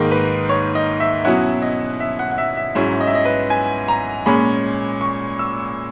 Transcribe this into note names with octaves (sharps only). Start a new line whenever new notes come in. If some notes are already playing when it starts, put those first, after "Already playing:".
Already playing: G#2 D#3 A#3 D#4 A#4
B4
C#5
D#5
E5
B2 F#3 C#4 E4 F#5
D#5
E5
F#5
F#5
E5
E5
G#2 F#3 C#4 E4 E5
D#5
E5
D#5
B4
G#5
A#5
A#2 G#3 C#4 B5
C#6
E6